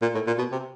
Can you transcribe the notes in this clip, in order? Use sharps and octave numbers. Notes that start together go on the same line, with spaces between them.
A#2
A2
A#2
B2
C3